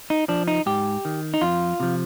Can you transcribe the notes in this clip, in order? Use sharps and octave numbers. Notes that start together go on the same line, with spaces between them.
D#4
F3 D4
D#4
G#2 G4
D#3
D#4
F2 F4
C3 F3